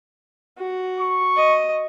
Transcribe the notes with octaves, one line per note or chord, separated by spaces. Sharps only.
F#4
C#6
D#5